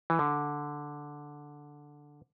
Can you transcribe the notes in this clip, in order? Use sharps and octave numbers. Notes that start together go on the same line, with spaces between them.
E3
D3